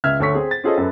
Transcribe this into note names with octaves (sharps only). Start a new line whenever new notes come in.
C#2 E5 F6 G#6
D2 A4 C#5 C#6 B6
C4 G#4
A6
C#4 F4 G#4 A4 C5 D#5
F#2 A4 B4